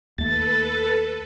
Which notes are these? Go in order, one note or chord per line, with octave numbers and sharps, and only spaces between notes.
D#2 A3 A4 B4 A6